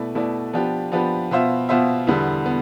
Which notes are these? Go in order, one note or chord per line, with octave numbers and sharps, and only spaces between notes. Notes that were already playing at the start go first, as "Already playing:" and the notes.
Already playing: B2 A3 E4 B4 D5
B2 A3 E4 B4 D5
F3 B3 D4 G4 B4
F3 B3 D4 G4 B4
B2 B3 F4 C5 E5
B2 B3 F4 C5 E5
E2 D3 G3 B3
B3